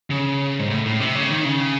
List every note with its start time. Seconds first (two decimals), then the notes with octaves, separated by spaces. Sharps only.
0.10 C#3
0.59 G#2
0.70 A2
0.85 A2
1.00 C3
1.15 C#3
1.30 D#3
1.45 C#3